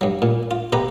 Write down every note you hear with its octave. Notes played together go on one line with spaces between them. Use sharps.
G2 F#3
A#2
F4
B2 G4 B4 A#5